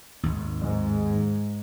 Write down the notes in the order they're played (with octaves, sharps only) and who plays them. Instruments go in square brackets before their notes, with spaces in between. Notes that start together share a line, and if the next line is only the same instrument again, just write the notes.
[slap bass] G#1 D#2
[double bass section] G#2